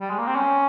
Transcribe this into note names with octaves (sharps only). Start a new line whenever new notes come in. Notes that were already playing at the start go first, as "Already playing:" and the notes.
G3
G#3
A#3
C4
C#4